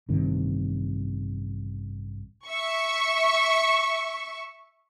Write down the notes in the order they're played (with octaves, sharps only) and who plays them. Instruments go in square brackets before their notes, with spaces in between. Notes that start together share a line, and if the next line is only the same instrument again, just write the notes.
[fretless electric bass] A1 G2 C3 D#3
[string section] E5 C#6